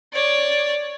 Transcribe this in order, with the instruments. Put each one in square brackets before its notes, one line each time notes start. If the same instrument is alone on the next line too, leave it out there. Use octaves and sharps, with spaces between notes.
[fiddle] C#5 D5